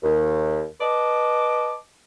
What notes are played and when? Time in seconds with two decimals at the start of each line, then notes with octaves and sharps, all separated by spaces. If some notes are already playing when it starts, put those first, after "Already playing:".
0.03 D#2
0.81 B4 D#5 A5 D6